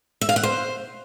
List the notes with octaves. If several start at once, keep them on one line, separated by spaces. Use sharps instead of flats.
E5
F5
F#5
C5